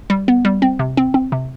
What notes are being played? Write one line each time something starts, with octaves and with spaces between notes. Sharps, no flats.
G3
B3
G3
C4
C3
C4
C4
C3